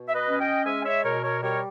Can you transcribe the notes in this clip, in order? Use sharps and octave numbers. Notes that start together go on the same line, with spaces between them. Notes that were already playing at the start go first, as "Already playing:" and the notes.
Already playing: B2
E5
B4 D#5
C#4
D#5 G5
G#3 E5 G#5
C#5 E5
B2 A#4 C#5
A#4 C#5
G3 A#4 C#5